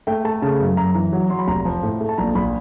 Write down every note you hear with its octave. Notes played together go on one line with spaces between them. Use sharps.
A3 G5
A3 A5
C#3 A5
F#2
F#2 A#5
E3
F#3
F#3 C6
B5
F1 A#5
F3
A2
A3
A5
A#1 A#5
A#1 B5